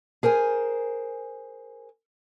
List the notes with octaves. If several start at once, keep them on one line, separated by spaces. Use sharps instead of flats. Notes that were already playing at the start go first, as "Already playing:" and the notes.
G#4 A#4 C5 G#5